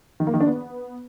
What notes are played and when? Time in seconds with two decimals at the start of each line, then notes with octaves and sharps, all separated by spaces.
0.20 D#3
0.27 A#3
0.34 D#3
0.40 D4
0.47 B3